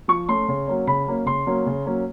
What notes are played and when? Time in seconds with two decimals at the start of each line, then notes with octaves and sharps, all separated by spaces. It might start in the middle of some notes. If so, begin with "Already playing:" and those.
0.08 F3 C#6
0.28 A3 C#4 C6
0.49 C#3
0.67 F#3 A#3 C#4
0.87 C#3 B5
1.07 F#3 A#3 C#4
1.26 C#3 C6
1.46 F#3 A#3 C#4
1.66 C#3
1.86 F#3 A#3 C#4